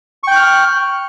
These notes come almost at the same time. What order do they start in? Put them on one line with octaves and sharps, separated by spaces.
C#6 G5 F#6 F6